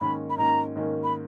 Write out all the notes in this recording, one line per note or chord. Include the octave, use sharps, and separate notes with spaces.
G#2 D#3 A#3 C#4 B5
B5
G#2 D#3 A#3 C#4 A#5
G#2 D#3 A#3 C#4
B5